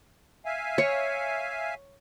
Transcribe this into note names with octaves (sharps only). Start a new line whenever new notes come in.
E5 F5 G#5
C#5